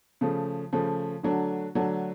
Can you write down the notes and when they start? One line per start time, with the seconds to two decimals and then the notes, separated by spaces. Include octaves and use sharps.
0.21 C#3 F3 A3
0.73 C#3 F3 A3
1.23 D3 F#3 A3 D4
1.75 D3 F#3 A3 D4